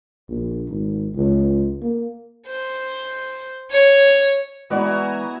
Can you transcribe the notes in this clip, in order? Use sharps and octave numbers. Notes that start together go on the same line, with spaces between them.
A#1
G#1
C#2
A#3
C5
C#5
E3 G#3 B3 E4 F#4 D5 G#5 A#5